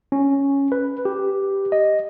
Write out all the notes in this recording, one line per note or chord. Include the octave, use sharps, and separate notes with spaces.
C#4
B4
G4
D#5